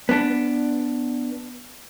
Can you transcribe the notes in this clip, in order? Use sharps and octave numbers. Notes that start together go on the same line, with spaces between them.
B3 D4